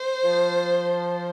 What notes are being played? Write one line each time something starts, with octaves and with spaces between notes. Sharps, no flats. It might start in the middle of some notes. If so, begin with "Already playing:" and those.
Already playing: C5
F3